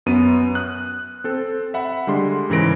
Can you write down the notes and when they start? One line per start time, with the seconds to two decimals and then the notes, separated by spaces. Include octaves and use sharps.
0.06 F#2 B3 D#7
0.55 D#6 F6 F#6
1.24 C4 A4
1.74 E5 F#5 B5
2.07 D3 G3 G#3 C6
2.50 G#2 C#3 E3 A#4 A#6 D7